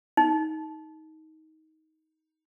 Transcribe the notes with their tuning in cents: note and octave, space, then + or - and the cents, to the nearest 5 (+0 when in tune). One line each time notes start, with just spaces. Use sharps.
D#4 +20